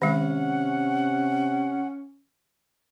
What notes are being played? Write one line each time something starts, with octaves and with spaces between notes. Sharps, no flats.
C3 D#3 G#3 C#4 F#5